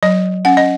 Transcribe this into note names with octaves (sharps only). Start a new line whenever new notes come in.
F#3 D#5
C#4 F#5
D#5